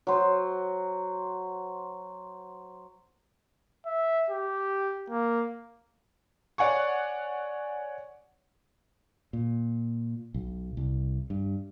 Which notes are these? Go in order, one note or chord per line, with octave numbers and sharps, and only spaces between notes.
F#3 C5
E5
G4
A#3
C#5 D5 F#5 G#5 C#6
A#2
B1
C2
G2